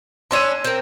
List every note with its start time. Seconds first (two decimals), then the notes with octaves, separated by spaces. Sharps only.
0.31 C#4 D4 B4 C6 E6 D#7
0.64 C4 A#4